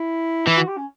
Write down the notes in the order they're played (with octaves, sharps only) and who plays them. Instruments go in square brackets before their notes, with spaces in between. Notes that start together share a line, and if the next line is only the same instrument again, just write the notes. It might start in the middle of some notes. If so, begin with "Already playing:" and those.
Already playing: [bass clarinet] E4
[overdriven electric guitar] E3 [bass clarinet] E4
[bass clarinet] F#4
G4
C#4